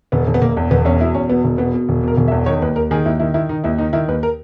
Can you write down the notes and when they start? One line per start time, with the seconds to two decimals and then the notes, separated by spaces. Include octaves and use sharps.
0.12 E1 B3
0.27 E1
0.34 B3
0.41 E1 A#3
0.57 E2
0.71 E1 B3
0.85 E2 C#4
1.00 B2 E4
1.15 E2 C#4
1.29 B2 B3
1.44 E1
1.58 B2 B3
1.74 B2
1.89 E1
2.03 B2 A#4
2.17 E1
2.28 E5
2.32 E2
2.46 D#3 C#5
2.62 D#2 B4
2.76 D#2 A#4
2.91 D#3 G#4
3.05 D#2 E4
3.20 D#3 E4
3.34 D#3 E4
3.49 D#3 D#4
3.64 D#2 E4
3.78 D#3 D#4
3.93 D#3 E4
4.08 D#2 B4
4.23 A#4